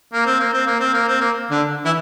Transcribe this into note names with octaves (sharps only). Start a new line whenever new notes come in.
A#3
C4
A#3
C4
A#3
C4
A#3
C4
A#3
D3 D4
E3 E4